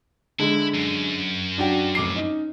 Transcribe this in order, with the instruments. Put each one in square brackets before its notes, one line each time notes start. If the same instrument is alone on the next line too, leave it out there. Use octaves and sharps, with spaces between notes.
[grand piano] D3 G#3 [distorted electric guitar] E4
[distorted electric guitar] F#2
[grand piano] D4 F#4 G5
F1 D6 C7
C#4 D#4